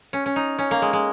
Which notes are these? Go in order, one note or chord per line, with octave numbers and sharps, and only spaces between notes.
C#4
C#4
D#4
C#4
A#3
G#3
G#3